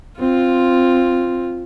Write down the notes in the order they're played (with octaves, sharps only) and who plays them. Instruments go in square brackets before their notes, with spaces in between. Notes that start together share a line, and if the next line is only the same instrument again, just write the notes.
[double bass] C4 [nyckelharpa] F4